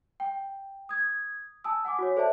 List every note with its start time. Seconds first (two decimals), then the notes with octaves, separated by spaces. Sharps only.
0.20 G5
0.89 D#6 G#6
1.64 G#5 A5 D#6 E6
1.85 F#5 G#5 D6
1.99 F#4 C#5
2.17 A4 C5 D5 E5 A5